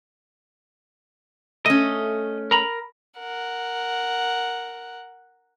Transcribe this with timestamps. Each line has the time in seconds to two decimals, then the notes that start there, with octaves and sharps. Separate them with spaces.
1.66 A3 C#4 D#5
2.51 A#4 A#5 B5
3.19 A#4 F#5